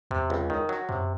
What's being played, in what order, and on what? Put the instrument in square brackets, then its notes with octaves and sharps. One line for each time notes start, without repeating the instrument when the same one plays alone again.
[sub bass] E2 [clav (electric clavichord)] C3
[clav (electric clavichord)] C#2
D#3
F#3
[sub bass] F#2 [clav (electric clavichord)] C3